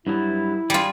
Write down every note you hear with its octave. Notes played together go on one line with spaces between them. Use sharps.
G2 F#3 B3 E4
G3 F4 G#4